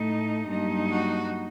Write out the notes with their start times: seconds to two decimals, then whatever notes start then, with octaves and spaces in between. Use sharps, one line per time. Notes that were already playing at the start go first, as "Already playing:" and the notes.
Already playing: A2 A3 D#4
0.48 G2 F#3 A#3 D#4
0.91 F#4